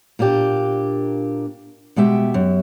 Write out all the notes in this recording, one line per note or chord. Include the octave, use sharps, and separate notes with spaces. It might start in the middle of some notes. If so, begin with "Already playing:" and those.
A#2 A#3 D4 G4
B2 G#3 G4 E5 G5
F#2